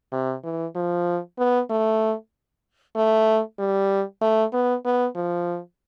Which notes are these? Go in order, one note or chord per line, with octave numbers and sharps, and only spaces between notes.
C3
E3
F3
B3
A3
A3
G3
A3
B3
B3
F3